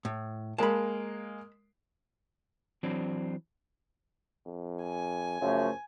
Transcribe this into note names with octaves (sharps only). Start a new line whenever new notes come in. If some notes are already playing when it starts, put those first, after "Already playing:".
A2
G#3 A#3 A5 B5
E3 F#3 C4 D4
F2
G#5
F#2 C#3 F3 A3